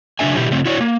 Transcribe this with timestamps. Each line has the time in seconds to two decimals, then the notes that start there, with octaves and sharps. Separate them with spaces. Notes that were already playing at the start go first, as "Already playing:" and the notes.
0.19 C#3 F#3 G#3 D4 E5 G#5
0.36 B2 E3 E4 G4
0.51 C#3 A3 C4
0.66 E4 F#4 C#5 D5
0.81 A#3